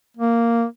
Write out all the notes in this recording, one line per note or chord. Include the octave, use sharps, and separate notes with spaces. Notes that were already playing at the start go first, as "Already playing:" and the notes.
A#3